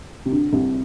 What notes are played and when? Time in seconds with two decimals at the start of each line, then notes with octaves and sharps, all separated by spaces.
0.25 C3
0.32 D2 D3
0.52 C2 C3